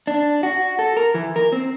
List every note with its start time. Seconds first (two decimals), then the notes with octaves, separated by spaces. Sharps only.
0.07 D4
0.43 F#4
0.79 A4
0.97 A#4
1.14 E3
1.36 A#4
1.52 C4